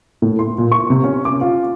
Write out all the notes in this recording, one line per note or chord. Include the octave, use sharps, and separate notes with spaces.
A2
C6
A#2
C#6
C3
C#4
D6
F4